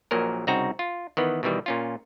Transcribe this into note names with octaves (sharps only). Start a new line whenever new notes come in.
A#1 A#2 F#3 A#4
C2 C#3 C4 D#4 F#4 A#5
F4
D#3 E3 B3
B2 D#3 E3 G3
A#2 C#4 F4